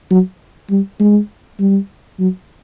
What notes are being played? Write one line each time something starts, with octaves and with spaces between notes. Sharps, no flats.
F#3
G3
G#3
G3
F#3